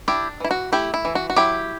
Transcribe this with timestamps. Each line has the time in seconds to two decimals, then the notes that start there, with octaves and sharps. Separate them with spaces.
0.08 D4 E4 G4
0.40 E3 E4
0.51 F#4
0.72 A3 E4 G4
0.94 E4
1.05 E3
1.15 F#4
1.30 F#4
1.36 F#3 E4 G4